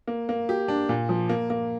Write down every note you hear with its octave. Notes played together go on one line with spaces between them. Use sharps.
A#3
A#3
G4
D4
A#2
F3
A#3
A#3